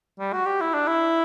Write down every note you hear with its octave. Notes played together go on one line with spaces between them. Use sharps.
G3
F#4
G4
E4
D4
E4